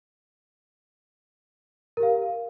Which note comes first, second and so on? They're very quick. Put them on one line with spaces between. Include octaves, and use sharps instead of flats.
A#4 G4 F5